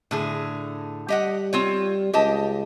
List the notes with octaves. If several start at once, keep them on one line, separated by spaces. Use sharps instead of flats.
A2 D3 G#4
G3 G4 D#5 F#5
C4 F4 C#5
C#2 G4 D#5 A5